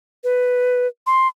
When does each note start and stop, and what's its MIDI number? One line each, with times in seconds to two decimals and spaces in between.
0.24 0.87 71
1.07 1.28 84